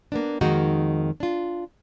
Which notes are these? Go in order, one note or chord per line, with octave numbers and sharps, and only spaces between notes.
A#3 B3 D4
F2 D#3 G#3 A#3 D#4 F#4
D4 F4